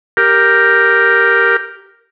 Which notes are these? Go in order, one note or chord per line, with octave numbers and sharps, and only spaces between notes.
G4 A#4